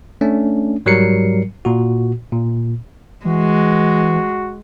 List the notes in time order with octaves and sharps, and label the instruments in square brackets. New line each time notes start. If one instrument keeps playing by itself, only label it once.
[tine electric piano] A3 C#4 D4
G#2 F#3 G3 A#4 C7 C#7
A#2 F#4
A#2
[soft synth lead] E3 [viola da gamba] G#3 [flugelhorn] F#4